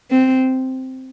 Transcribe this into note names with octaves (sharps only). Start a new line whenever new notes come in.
C4